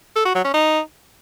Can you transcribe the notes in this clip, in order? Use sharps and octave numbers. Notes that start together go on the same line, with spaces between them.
A4
F#4
F#3
C#4
D#4